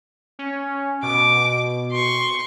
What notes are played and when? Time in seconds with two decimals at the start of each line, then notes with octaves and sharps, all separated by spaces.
0.39 C#4
1.03 B2 D6
1.91 C6 C#6